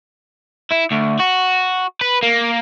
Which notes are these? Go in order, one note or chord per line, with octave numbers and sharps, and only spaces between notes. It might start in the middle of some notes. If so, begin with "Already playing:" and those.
E4
D2
F#4
B4
A#3